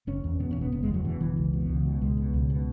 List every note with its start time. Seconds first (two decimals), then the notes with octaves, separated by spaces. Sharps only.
0.07 F#1 C#4
0.24 E2
0.40 B2 B3
0.51 C#4
0.56 F#1 B3
0.72 F#1 B3
0.83 G#3
0.88 E2
0.94 F#3
1.05 B2 E3
1.21 F#1 E3
1.37 C#2
1.53 B2
1.69 C#2
1.85 B2
2.01 C#2 G#3
2.17 B2
2.34 C#2
2.50 B2